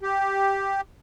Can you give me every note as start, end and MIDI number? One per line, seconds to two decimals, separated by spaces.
0.01 0.81 67